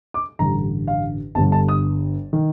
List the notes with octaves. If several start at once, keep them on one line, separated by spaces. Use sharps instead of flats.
D6
A1 G2 D3 A#5
F5
G1 G2 D3 A5
A5
D#6
D#3